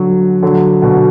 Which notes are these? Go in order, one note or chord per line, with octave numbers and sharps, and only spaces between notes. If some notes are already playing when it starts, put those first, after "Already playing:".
Already playing: D3 F#3
D3 F#3
B2 D3